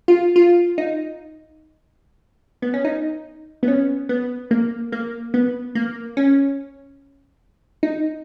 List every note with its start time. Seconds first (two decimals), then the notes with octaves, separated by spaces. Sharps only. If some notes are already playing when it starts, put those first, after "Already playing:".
0.08 F4
0.36 F4
0.78 D#4
2.62 B3
2.74 C#4
2.85 D#4
3.63 B3
3.68 C#4
4.09 B3
4.51 A#3
4.92 A#3
5.34 B3
5.75 A#3
6.17 C#4
7.83 D#4